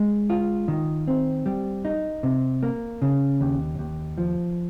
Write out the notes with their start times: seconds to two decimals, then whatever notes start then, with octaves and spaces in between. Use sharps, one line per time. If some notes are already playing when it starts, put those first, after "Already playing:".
Already playing: G#3
0.30 F4
0.68 D#3
1.07 C4
1.46 G3
1.85 D#4
2.23 C3
2.63 A#3
3.02 C#3
3.41 D#2
3.79 D#2
4.18 F3